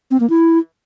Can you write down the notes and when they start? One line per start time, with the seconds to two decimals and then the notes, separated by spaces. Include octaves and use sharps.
0.11 C4
0.20 A#3
0.30 E4